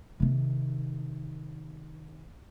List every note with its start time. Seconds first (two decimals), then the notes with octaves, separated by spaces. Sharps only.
0.20 C3 D#3